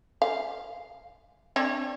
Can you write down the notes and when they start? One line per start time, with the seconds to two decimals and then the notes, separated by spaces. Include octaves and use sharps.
0.22 F5
1.56 C4 D4 C#5